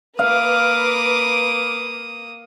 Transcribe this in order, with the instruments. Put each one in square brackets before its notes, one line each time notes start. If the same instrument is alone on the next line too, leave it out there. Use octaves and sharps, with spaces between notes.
[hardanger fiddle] A#3 D#6 [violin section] B4 D6 [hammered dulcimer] F5